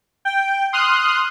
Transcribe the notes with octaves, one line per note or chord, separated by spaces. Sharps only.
G5
C6 D#6 F6 F#6